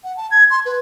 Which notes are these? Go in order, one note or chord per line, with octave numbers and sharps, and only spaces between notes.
F#5
A5
G#6
C6
B4